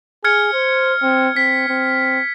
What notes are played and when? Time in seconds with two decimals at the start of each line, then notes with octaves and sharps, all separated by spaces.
0.24 G#4 F6 G#6 C#7
0.53 C5
1.03 C4
1.37 C4 B6
1.69 C4